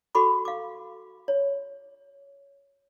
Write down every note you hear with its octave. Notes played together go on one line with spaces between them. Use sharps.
F#4 A4 B5 C#6 D6
F5 D6
C#5